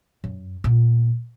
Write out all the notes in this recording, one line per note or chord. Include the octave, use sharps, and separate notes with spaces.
F#2
A#2 B3